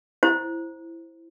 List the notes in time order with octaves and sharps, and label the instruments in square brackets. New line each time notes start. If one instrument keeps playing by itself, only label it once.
[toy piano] E4 C5